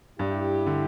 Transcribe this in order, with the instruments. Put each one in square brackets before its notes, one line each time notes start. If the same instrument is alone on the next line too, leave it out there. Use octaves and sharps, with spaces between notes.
[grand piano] G2 [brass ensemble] E4 G4
[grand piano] D3